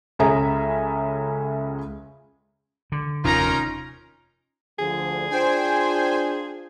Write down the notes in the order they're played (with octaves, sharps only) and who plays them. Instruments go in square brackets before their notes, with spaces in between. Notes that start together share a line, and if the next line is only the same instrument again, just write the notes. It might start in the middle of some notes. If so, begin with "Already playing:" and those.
[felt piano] C#2 C#4 G#4 A4 E5 A#5
[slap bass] D3
[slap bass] F1 D#2 [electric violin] C#4 A#5 [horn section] D#4 F4 A#4
[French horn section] D2 D3 F3 [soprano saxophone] G#4
[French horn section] D4 F4 [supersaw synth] C5 G5 G#5